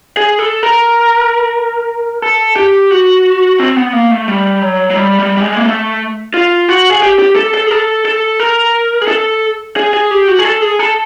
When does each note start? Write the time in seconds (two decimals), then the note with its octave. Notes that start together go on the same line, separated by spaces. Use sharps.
0.17 G#4
0.39 A4
0.63 A#4
2.22 A4
2.56 G4
2.91 F#4
3.59 C4
3.76 B3
3.93 A#3
4.11 A3
4.28 G3
4.62 F#3
4.90 F#3
4.97 G3
5.19 G3
5.37 G3
5.42 G#3
5.56 A#3
5.66 A3
6.34 F4
6.69 F#4
6.90 G#4
7.03 G4
7.19 G4
7.36 A4
7.54 A4
7.67 G#4
7.71 A4
8.05 A4
8.40 A#4
9.02 G#4
9.08 A4
9.76 G#4
9.94 G#4
10.11 G4
10.28 F#4
10.39 G#4
10.45 A4
10.62 G#4
10.79 A4